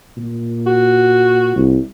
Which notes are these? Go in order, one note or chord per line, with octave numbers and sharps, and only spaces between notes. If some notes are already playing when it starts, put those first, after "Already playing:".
A#2
F#4
C2